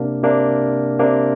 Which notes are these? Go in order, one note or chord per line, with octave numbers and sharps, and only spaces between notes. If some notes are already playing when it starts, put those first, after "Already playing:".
Already playing: C3 A#3 D4
C3 A#3 D4
C3 A#3 D4